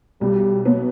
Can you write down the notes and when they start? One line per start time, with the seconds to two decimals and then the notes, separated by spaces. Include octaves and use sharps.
0.21 B1 G3
0.65 B2 F#3 B3